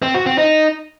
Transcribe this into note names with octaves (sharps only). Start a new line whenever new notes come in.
C4
F#4
C4
D#4